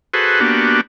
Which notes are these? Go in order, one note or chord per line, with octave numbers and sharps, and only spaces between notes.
F#4 G#4 A4 B4 C5
A#3 B3 D4 F#4 G4